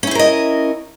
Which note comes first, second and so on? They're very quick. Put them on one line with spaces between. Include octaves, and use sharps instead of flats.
C#4 E4 C5 A#4 D#5